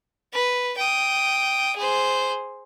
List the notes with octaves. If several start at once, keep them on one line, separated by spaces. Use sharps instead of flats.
B4
G5 D#6
G#4 C5